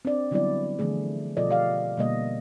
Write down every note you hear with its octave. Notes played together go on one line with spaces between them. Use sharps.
C4 D4 D5
D3 F#3 G3 B3 E4 D5
D3 E3 F3 A3 G#4
B2 F3 F4 A4 D5 D#5
G4 D5 D#5 F5
B2 D3 G3 A#3 D#5